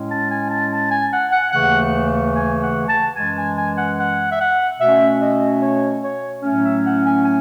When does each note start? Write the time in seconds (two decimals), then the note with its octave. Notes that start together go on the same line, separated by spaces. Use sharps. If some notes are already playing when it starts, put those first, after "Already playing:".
Already playing: A2 G#3 C#4
0.10 A5
0.30 G#5
0.49 A5
0.71 A5
0.90 G#5
1.11 F#5
1.31 F#5
1.52 D#2 C#3 E3 A3 F#5
2.34 G#5
2.61 F#5
2.89 A5
3.16 F#2 E3 G#3 G#5
3.36 G#5
3.57 G#5
3.77 F#5
3.98 F#5
4.31 E5
4.39 F#5
4.80 B2 A3 C#4 E5
5.21 D#5
5.61 C#5
6.03 C#5
6.43 A2 F#3 A3 C#4
6.63 E5
6.85 F#5
7.04 G#5
7.24 G#5